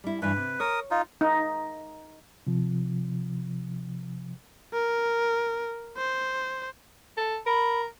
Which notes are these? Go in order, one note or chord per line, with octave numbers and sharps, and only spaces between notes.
G3 E4
G2 E3 B4
C3
A#4 C#5 D#6
D#4 F4
D#4
C3 F3
A#4
C5
A4
A#4 B5